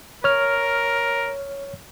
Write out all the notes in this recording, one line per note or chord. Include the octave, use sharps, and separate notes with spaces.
A#4 C#5 F6